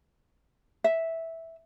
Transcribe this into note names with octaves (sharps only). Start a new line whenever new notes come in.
E5